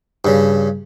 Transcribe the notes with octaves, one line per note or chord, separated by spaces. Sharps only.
G2 C#3